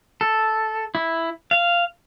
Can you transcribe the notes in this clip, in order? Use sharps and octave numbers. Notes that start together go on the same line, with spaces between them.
A4
E4
F5